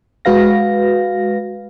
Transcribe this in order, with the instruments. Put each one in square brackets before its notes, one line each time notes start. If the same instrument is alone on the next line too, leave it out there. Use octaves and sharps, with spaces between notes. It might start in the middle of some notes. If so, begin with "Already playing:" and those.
[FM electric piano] G#3 F#4 B4 F5 A#6